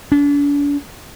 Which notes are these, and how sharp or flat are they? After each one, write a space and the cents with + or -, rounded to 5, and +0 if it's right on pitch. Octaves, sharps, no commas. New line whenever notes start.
D4 -40